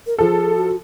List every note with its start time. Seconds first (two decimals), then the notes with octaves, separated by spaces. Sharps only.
0.07 A#4
0.18 F3 G#4 A4
0.55 F#4